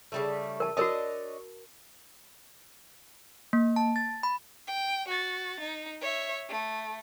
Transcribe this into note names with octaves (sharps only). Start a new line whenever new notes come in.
C#3 G3 A3
A#4 A5
D4 F#4 A#4 C#5 D#5 A5
A#3
A5
A6
B5
G5
F#4 A6
D#4
C#5 E5
A3